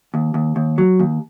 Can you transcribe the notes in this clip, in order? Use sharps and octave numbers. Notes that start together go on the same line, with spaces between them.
D#2
D#2
D#2
F#3
D#2